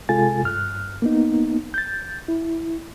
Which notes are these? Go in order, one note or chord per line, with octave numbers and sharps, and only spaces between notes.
C3 G#3 F4 A4 G#5 A6
G2 F6 F#6
A#3 B3 D#4
G6 A6
E4